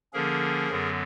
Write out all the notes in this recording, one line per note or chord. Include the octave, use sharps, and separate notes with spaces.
D3 F3 A#3 C#4 G#4 A#4
F#2 D3 F#3 B3